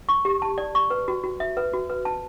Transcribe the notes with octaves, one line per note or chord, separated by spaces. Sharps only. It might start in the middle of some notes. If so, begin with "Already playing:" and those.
C#6
G4
A5
D5
C#6
B4
F#4
F#4
E5
B4
F#4
B4
A5